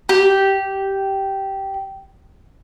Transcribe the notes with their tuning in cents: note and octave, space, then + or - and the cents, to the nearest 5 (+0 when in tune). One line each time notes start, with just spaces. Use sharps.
G4 -10